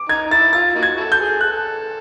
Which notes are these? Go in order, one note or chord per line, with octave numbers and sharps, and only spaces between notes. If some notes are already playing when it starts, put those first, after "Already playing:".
Already playing: D6
D#4 G#6
D#4
E4 A6
F4 A6
A#3 D#4 F#4
G#6
E4 F#4 A4
G6
G#4
A4 F#6